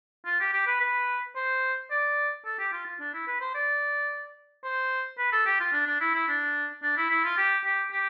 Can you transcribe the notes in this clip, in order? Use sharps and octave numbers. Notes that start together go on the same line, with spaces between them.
F4
G4
G4
B4
B4
C5
D5
A4
G4
F4
F4
D4
E4
B4
C5
D5
C5
B4
A4
G4
F4
D4
D4
E4
E4
D4
D4
E4
E4
F4
G4
G4
G4